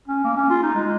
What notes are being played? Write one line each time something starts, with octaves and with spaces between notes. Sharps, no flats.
C#4
A#3
C#4
F4
D#4
G#3